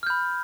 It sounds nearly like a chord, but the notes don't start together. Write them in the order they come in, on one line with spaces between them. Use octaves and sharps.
F6 G6 B5